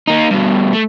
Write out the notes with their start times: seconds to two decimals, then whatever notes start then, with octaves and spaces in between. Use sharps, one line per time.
0.08 A#3 D#4
0.31 G2 B2
0.74 A3